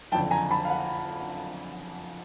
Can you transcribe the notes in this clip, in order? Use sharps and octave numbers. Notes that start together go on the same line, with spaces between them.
F#1 F2 D3 G5 A5
G#5 A#5
A5 B5
F5
F#5